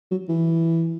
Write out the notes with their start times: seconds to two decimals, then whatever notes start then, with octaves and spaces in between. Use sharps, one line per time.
0.11 F#3
0.28 E3